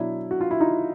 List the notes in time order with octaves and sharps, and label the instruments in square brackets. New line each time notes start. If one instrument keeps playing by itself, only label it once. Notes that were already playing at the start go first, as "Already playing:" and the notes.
Already playing: [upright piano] B2 F#3 D4 E4
F#4
F4
E4
D#4 F4